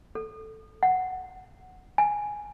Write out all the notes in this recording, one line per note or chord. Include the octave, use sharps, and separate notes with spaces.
A4
F#5
G#5